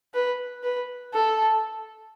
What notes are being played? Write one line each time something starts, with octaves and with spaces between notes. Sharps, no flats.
B4
B4
A4